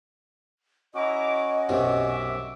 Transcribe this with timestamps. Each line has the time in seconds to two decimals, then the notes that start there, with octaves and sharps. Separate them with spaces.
0.94 C#4 E4 F#4 D#5 A#5 D6
1.69 B1 F#2 C3 E5 D6